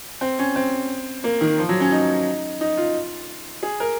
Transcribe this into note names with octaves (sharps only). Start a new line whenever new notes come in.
C4
C#4
C4
A#3
D#3
F3
F#3
C#4
D#4
D#4
F4
G#4
A#4